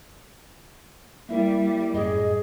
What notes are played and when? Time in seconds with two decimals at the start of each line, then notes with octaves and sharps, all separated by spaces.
1.29 G3 A#3 E4 A#4 E5
1.94 F#2 A2 G#4 D#5